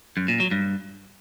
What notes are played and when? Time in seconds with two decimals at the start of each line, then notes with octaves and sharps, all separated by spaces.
0.17 F#2
0.28 A#2
0.40 F#3
0.51 G2